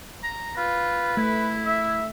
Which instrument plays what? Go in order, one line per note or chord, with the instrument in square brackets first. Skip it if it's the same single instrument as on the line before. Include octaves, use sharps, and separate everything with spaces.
[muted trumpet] A#5
[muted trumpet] F4 [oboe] B4
[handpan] A3 [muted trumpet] E4
[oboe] E5